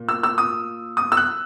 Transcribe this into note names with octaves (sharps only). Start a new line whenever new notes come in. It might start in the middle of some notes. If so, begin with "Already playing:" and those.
Already playing: A#2
E6
E6
D#6
D#6
E6
F#6